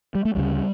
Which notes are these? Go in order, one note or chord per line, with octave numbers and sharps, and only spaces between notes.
G3
A3
D2 C#3 G3